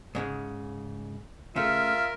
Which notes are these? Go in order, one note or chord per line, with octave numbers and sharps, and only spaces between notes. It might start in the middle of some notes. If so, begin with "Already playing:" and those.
G#2 C#3 G#3
C#3 A3 F4 A#4 E5